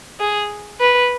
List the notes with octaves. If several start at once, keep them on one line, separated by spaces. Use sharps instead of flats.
G#4
B4